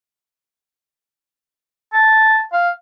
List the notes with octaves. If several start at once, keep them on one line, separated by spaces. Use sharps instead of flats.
A5
F5